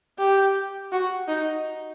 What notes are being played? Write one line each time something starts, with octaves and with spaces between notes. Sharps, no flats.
G4
F#4
D#4